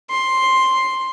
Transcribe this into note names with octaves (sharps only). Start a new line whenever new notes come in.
C6